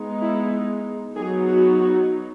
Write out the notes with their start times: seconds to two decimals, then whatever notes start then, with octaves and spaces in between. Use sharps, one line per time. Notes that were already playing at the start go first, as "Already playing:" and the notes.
Already playing: G#3 B3 D#4
0.20 E4
1.15 F#3 B3 D#4 G#4
1.48 F#4
1.79 F#4